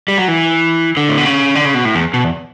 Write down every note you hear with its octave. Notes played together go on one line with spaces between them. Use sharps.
G3
F#3
E3
D3
A2
B2
C#3
D3
C#3
B2
A2
E2
B2
E2